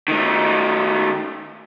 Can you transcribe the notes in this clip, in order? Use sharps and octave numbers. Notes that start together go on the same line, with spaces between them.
D#3 A3